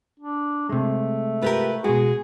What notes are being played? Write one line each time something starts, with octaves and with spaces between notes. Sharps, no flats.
D4
C3 G#3 A3
F4 G4 A#4 B4
B2 G#3 F#4 G#4